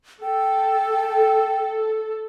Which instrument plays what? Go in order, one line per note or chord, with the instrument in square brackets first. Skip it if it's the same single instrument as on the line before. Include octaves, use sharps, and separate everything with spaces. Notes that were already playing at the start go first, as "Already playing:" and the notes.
[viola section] A4 [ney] G5